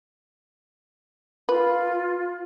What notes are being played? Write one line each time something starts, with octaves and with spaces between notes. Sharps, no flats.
F4 B4